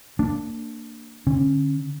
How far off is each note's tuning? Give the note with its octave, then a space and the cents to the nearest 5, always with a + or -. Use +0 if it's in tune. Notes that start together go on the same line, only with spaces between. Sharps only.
A#3 -30 D4 +0
D3 +0 C#4 -25